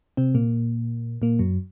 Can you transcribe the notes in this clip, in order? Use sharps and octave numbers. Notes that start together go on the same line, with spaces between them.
C3 C4
A#2 A#3
A#2 A#3
F#2 F#3